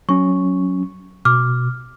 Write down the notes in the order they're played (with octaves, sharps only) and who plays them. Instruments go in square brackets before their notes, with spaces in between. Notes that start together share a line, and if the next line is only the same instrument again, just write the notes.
[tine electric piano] F#3 C#4 [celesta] C#6
[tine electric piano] B2 [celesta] D6 F6